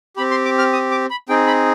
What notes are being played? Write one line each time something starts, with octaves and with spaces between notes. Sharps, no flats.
C4 G4 B5
C6
D6
F6
D#6
D6
B5
C4 D#4 G#4 G5
B5